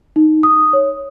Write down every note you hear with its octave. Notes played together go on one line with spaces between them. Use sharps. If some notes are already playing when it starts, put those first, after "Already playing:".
D#4
D#6
C#5